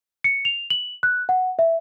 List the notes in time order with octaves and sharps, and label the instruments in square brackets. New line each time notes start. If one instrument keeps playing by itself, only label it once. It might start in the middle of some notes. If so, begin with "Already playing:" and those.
[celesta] C#7
F7
F#7
F#6
F#5
E5